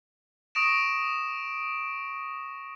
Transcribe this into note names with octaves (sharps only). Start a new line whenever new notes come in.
C#6 D#6 A#6 D7 E7